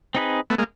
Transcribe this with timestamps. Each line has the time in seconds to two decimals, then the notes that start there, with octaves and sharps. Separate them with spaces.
0.15 C4 D#4 G#4 B4
0.50 A3 B3
0.58 G#3 A#3